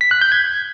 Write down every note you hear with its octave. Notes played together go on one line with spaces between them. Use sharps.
B6
F#6
G6
G#6